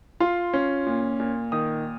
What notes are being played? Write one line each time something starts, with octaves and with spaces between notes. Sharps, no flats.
F4 C6
C#4
A#2
A#2
D#3 D#6